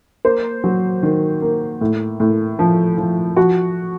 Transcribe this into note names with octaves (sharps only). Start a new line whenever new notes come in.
A#3 C5
F#3
D#3
A#3
A2
A2
F3
F3
F3 F#4